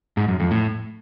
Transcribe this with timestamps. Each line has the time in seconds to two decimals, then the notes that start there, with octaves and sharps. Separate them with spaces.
0.17 G#2
0.28 F#2
0.40 F2
0.51 A2